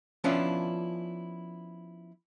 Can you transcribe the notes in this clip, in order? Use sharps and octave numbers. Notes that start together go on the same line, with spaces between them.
F3 B3 C#4 D4 E4 F4